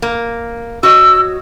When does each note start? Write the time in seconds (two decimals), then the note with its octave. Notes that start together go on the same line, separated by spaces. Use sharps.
0.02 A#3
0.83 F#4 C#5 D#5 E6